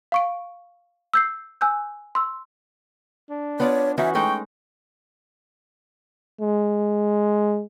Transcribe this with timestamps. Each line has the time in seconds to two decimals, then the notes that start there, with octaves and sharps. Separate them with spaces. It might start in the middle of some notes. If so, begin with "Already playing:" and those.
0.12 F5 C#6 D7
1.14 E6 G6 C7
1.61 G#5 E6 F#6 G6
2.15 C6 E6
3.29 D4
3.60 B3 F4 C#5 D5
3.98 E3 C#4 D#4 F#4 E5
4.15 G#3 A3 D#4 G5 C#6
6.41 G#3